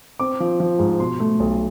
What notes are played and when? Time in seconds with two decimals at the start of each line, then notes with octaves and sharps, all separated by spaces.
0.20 C4 D6
0.40 F3
0.60 F3
0.79 G#2
1.00 B2 C6
1.20 A3
1.40 B1